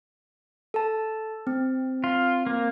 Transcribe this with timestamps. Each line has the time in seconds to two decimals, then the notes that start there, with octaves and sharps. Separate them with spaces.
0.74 A4 A5
1.47 C4
2.04 F4
2.47 A#3